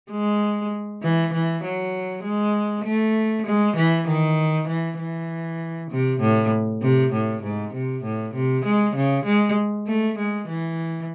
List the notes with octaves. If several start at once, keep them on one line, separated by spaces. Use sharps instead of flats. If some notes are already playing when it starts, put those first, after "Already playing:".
G#3
E3
E3
F#3
G#3
A3
G#3
E3
D#3
E3
E3
C3
A2
C3
A2
G#2
C3
A2
C3
G#3
C#3
G#3
A3
G#3
E3